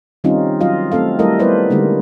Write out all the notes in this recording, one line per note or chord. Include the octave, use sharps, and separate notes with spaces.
D#3 G3 C4 C#4 D#4 F4
F#3 F4 D#5 F5
A3 C4 A4 F5
G3 A3 E4 A4 A#4 D#5
G3 B3 E4 B4 C5 D5
D3 G3 G#3 A#3 D#4